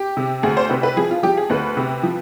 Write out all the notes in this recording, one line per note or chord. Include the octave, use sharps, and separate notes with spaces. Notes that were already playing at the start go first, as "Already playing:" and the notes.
Already playing: G4
C3
D2 G#4
C5
C3 B4
B4
F3 G#4
F4
F3 G4
G#4
D2 B4
C3
F3